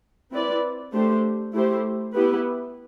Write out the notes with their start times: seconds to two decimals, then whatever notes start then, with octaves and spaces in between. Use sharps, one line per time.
0.32 C4 E4 B4 D5
0.92 A3 D4 G4 C5
1.53 A3 E4 G4 C5
2.14 B3 E4 G4 B4